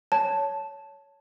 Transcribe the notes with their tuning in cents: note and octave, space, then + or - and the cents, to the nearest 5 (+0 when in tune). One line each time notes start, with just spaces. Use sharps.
C#5 +15 A5 +0